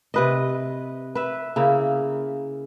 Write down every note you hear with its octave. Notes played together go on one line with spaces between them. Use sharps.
C3 B4 D#5
B4 E5
C#3 A#3 E4